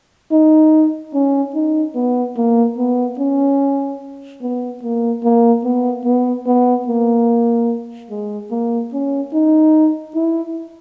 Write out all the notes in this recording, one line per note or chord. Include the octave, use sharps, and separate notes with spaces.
D#4
C#4
D#4
B3
A#3
B3
C#4
B3
A#3
A#3
B3
B3
B3
A#3
G#3
A#3
C#4
D#4
E4